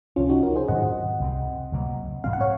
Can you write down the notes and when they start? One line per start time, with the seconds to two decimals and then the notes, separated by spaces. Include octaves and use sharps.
0.16 C#2 C3 F3 C#4 F4
0.29 D#4 F#4
0.43 F#4 A#4
0.56 G#4 C5
0.68 G#2 D#3 F#3 C4 D#5 F#5
1.20 C2 C3 F#3 C4
1.72 C#2 C3 F#3 A#3
2.24 G#2 F3 C4 F5
2.33 F#5
2.41 C#5 F5